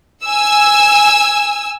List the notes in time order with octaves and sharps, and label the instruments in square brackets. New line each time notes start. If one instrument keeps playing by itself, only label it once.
[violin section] G#5 E6